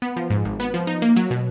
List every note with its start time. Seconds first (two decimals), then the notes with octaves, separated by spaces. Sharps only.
0.02 B3
0.16 F3
0.30 G#2
0.45 G#1
0.60 B3
0.74 F3
0.87 D#4
1.02 A#3
1.16 F#3
1.31 B2